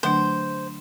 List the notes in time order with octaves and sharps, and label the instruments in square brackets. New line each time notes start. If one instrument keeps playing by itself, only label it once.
[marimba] D3 F#3 A3 D4 [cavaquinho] C5